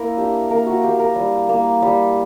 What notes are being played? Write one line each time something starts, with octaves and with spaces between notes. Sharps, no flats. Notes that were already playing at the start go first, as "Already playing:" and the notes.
Already playing: A#3 E4 A#4
D4 G4
A#3 A#4
F#4
A#3 G4
A#4
G3
A#3
G3